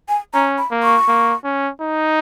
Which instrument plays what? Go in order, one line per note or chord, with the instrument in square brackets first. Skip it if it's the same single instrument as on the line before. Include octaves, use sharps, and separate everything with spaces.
[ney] G#5
[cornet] C#4 [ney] A#5
[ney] B5
[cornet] A#3
[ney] C#6
[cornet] A#3
C#4
D#4